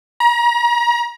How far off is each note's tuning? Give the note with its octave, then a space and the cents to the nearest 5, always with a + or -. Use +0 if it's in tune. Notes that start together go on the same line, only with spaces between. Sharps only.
A#5 +35